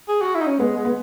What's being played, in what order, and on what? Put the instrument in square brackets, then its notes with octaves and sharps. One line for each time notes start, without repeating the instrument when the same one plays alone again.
[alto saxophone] G#4
F#4
E4
D#4
C#4
[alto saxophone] G#3 [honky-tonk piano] B3
[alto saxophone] G#3
[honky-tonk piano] B3